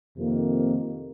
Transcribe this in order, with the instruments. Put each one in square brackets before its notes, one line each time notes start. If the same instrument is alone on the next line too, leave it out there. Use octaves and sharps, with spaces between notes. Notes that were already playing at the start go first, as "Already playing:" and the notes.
[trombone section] F2 C3 D#3 A#3